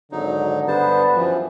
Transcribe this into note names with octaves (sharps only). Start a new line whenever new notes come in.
G#1 D3 F#3 D#4
G2 B3 C5 A5
F#2 E3 F3